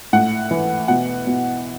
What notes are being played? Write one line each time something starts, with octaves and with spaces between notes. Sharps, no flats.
A2 F#5
E3
B2 F#5
B2